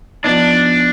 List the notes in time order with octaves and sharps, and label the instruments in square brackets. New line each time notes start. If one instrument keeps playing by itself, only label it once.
[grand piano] F3 B3 D#4 [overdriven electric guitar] D4